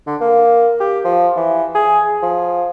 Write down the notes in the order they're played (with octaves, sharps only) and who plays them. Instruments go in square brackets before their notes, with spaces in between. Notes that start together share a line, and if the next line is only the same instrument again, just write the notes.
[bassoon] D3
A#3
G4
F3
E3
G#4
F3